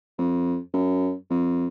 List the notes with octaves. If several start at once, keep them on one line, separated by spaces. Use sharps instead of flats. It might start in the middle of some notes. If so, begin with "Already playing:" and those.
F2
F#2
F2